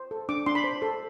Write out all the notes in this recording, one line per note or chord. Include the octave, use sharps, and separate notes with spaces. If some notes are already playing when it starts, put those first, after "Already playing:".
Already playing: C5
A4
D4 D6
D4 C6
B5
C5
A4